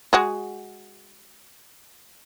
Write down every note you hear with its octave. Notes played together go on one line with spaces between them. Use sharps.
G#3 F#4 G#4